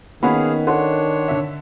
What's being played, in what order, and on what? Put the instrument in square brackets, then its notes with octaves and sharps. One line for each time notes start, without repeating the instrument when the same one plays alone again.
[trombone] D#3 [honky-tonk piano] A#3 C#4 F#4 [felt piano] B3 B5 [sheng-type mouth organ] G#4 F5
[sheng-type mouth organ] D4 C#5 [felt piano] A4 F#5 C6
[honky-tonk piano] D3 E5